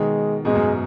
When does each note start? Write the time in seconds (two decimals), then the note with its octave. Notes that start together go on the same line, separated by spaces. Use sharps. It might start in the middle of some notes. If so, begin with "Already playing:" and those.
Already playing: B2 D#3 G#3
0.45 G#2 B2 G#3
0.55 F#2